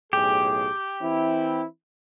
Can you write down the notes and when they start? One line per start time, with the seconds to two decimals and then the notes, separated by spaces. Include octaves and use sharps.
0.13 B1 A2 G4 G#4
1.02 E3 C4 E4